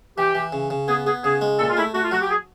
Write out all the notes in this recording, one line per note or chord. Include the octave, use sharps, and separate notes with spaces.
E3 G4
E3
C#3
C#3
B3 G#4
B3 G#4
C#3 G#4
G#3
A#2 A4
F4
A3 E4
A3 F#4
F4
F#3 F#4
G4
G#4